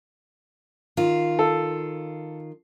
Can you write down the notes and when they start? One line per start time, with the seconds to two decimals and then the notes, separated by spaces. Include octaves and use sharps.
0.97 D#3 F4
1.39 A4